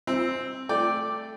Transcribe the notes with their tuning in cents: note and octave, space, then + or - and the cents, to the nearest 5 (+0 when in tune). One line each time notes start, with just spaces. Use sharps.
C4 +0 E6 +0
A3 +0 D5 +0 G5 +0